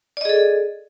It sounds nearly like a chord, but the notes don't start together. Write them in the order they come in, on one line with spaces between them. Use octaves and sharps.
D5 D#5 G#4 A4